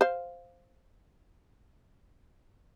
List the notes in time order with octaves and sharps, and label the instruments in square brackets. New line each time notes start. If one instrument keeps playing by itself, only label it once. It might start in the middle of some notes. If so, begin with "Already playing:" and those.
[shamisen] C5 F5